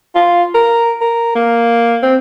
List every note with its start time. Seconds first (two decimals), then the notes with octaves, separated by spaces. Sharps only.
0.15 F4
0.54 A#4
1.01 A#4
1.35 A#3
2.03 C4